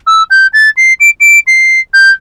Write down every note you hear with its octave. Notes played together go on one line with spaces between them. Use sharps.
E6
G6
A6
C7
D7
D7
C7
G6